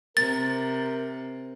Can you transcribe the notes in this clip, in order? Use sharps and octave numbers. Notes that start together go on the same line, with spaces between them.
C3 A#4 A6